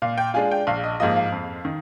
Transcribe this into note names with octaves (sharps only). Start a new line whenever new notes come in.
A#2 F5
G5
G#3 D4 F4 G#5
G5
A#1 F5
D#5
G#2 F3 A#3 F4 D#5
F5
F2
D#3